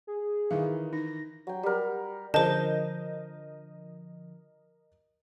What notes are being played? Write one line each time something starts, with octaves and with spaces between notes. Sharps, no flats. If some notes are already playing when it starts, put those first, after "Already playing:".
G#4
D#3 E3 F5
D#4 A#6
F#3 G5
G3 A#4
D3 F3 A#4 C5 D#5 A5 G6